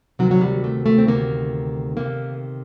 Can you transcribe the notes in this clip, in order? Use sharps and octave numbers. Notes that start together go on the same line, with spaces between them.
D2 C3 D#3 F#3
F#3
G3
A3
A3
C4
D2 C3 D#3 A#3
C3 D#3 A#3